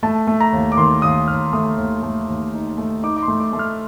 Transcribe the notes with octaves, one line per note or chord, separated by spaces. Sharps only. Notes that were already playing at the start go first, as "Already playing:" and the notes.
A3 A5
A3
A#5
D#2
D6
D#3 C6
D#2 D#6
D#2 F6
A3 D#6
D#2
A3
D#2
D#4
A3
D#4 D6
D6
C6
A3
D6
A3
F6